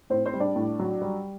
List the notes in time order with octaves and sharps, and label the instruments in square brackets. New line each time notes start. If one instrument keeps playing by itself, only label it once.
[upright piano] A2 C4 C5
C4 C5
G3
D4 D5
A2
F#3
G3